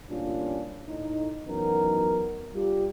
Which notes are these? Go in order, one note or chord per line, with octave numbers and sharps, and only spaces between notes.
A1 G2 A#2 C#4 D4 F4
A2 D#4
F#2 E3 F#3 B3 D#4 A#4
G3 F4 G4